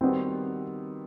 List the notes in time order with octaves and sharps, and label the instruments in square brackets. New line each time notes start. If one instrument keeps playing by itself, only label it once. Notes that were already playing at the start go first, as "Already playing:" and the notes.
[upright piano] D#3 G3 B3 F#4 [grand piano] C4